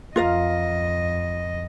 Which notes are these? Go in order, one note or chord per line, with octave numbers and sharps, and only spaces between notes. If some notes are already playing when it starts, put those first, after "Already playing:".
F2 F4 A#4 D#5 F5